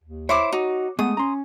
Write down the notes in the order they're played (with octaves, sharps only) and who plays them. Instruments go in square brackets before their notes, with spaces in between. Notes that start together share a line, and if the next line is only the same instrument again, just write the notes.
[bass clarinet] D#2
[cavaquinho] E4 C5 D6 [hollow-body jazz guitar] C#5
[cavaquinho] D#4 [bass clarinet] F#4
[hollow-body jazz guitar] G#3 A3 G#4 [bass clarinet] B3 [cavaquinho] D#6
[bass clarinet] C#4 [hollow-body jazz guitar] A#5 C6